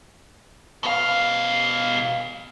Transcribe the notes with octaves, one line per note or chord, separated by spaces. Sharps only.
B2 F5